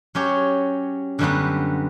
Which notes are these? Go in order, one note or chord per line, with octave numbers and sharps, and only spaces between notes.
F#3 C#4 G4 C#5
F#2 D3 G3 B3 F#4